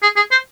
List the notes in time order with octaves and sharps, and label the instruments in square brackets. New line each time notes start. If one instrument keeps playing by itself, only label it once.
[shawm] G#4
G#4
C5